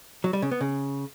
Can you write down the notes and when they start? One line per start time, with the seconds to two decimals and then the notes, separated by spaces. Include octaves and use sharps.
0.24 F#3
0.33 G3
0.42 C#3
0.51 B3
0.61 C#3